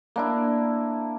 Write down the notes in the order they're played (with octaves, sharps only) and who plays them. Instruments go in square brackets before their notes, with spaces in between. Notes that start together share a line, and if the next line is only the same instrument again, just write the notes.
[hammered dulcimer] A#3 D4 E4